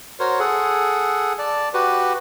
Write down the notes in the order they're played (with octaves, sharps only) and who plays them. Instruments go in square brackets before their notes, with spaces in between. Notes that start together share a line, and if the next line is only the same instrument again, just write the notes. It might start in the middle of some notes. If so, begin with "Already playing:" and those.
[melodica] F#4 A#4 C5 C#5
G#4 A4 F#5
D5 A5
F#4 G4 B4